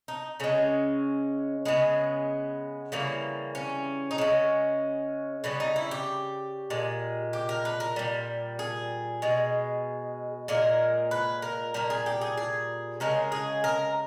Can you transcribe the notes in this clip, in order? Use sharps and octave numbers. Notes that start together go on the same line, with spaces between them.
D#4
C#3 G#3 C#4
C#3 G#3 B3
C#3 E3 G3 A#3
C#4
D#4
C#3 G#3 C#4
C#3 G3 B3
D#4
E4
G4
A#2 G#3
G4
A#4
B4
A#4
A#2 G3
G#4
B2 G#3
A#2 G#3 A#4
B4
A#4
A#2 G3 A#4
G#4
G4
G#4
G#4
C#3 G#3 A#4
G#4
A#4